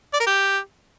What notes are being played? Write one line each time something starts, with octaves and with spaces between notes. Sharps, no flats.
D5
A#4
G4